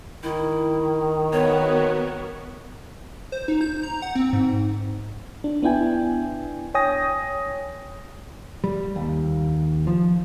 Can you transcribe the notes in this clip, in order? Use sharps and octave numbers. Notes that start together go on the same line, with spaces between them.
D#3 E4
B3 F#4 A#4 C#5
C5
D#4
G6
A#5
F#5
C4
G#2
D4
B3 D4 E4 G5 G#5
C#5 G5 G#5 D#6 A#6
G3
D#2
F3